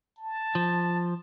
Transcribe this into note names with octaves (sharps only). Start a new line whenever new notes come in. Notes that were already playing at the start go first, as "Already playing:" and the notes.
A5
F3